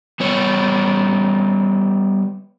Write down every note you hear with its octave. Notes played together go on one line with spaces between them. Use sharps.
G3 B3 C#5